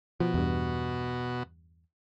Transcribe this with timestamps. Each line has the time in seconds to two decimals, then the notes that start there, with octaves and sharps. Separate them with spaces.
0.20 B2 F3 F#4
0.34 E2 G2